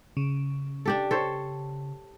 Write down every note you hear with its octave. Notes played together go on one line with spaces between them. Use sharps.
C#3
D4 G4 A4
A4 C5 C#5